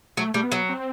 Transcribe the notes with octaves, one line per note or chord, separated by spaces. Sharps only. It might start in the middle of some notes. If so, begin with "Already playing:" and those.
F#3 A3
G3 A3
B3
F#3
C4